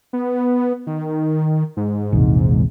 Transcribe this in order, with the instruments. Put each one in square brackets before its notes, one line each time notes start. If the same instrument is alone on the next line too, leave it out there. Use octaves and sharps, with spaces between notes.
[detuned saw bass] B3
D#3
G#2
[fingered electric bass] A#1 E2 C3